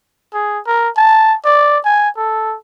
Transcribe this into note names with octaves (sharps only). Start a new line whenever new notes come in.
G#4
A#4
A5
D5
G#5
A4